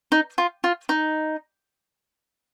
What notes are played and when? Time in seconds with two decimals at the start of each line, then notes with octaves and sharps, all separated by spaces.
0.12 D#4
0.38 F4
0.64 F4
0.89 D#4